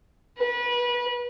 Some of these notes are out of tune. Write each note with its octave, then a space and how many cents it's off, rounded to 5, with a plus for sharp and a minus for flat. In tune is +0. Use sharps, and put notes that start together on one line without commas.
B4 -30